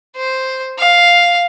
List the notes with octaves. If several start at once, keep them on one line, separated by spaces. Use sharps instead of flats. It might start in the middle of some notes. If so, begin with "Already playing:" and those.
C5
F5